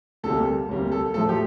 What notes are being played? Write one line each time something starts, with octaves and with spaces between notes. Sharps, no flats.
D2 C3 G3 A#3 A4
D2 C3 G3 A#3
A4
A2 F3 A3 A4
G4